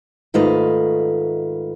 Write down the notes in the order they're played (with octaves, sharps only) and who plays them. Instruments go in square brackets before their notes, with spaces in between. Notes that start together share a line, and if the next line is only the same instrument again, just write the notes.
[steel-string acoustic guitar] G#2 D#3 A3 F4 B4 D#5